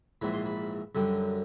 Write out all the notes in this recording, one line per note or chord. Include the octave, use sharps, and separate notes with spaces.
A#1 G#2 E3 B5
C6
B5
F#2 D3 G3